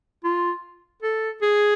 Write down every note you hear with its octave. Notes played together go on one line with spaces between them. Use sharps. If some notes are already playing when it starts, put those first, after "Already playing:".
F4
A4
G#4